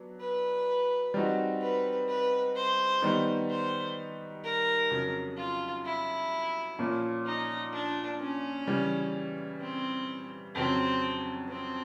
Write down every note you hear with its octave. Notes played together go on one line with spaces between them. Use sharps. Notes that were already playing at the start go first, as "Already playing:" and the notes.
Already playing: F#3 B3 D4
B4
G3 C4 D#4 F#4
B4
B4
C5
D#3 G3 B3 D#4
C5
A#4
F2 C#3 F#3
F4
E4
A#2 F3 A#3 C#4 F4
D#4
D4
C#4
C#3 E3 G3
C4
F2 C#3 F#3 C4
C4